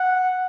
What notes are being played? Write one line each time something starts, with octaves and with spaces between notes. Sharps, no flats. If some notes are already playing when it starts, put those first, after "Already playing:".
Already playing: F#5